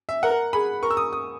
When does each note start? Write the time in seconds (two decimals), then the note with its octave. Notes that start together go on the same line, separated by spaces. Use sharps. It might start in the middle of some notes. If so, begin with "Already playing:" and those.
0.09 E5
0.23 A#4 F#5
0.53 G#4 B5
0.83 A#4 C#6
0.91 E6
0.97 D#6
1.13 D#6